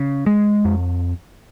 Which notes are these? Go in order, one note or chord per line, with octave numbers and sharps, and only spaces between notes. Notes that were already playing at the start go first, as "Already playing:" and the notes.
Already playing: C#3
G#3
F2